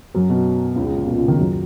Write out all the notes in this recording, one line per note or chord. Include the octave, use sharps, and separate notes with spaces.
F#2 F#3
B2
C#2 C#3
C#2 C#3
A#2
B2
C#2 C#3
D#2 D#3
F#2 F#3